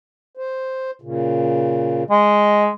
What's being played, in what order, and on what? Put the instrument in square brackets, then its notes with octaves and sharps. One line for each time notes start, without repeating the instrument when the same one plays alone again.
[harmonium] C5
A#2 C#3
[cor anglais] G#3 [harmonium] D#5